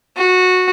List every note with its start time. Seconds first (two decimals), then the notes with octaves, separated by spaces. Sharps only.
0.17 F#4